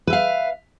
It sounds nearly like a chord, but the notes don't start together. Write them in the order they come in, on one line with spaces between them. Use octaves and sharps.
B4 E5 F5